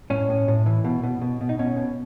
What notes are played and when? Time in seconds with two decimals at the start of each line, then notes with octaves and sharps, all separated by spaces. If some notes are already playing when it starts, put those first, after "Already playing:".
0.10 A2 C#4
0.29 A2
0.48 A2
0.66 E3
0.84 B2
1.03 B2
1.22 B2
1.41 B2
1.49 D#4
1.59 B2 C#4
1.77 B2